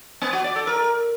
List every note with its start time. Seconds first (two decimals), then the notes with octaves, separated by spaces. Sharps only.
0.22 B3
0.33 F#4
0.44 D5
0.56 A4
0.67 A#4